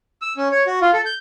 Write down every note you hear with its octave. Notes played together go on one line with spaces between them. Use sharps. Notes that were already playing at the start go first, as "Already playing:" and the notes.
E6
C#4
C#5
F#4
F4
A4
G6